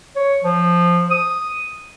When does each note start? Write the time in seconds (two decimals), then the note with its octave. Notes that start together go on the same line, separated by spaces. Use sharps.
0.16 C#5
0.44 F3
1.11 D#6